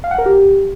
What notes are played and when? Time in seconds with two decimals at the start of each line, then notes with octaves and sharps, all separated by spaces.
0.04 F5
0.11 F#5
0.18 A#4
0.26 G4